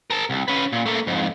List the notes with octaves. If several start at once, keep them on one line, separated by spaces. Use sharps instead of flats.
A#4 A5
C2
C#4 B4
A#2
A3 A#3
F2 G#2